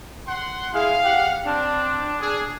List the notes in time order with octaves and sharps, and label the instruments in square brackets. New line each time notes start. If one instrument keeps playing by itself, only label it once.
[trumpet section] F#5 C6
[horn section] G#3 E4 G#4 [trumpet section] F5
[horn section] G4 F#5
[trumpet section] C4 [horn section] D4
[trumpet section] G#4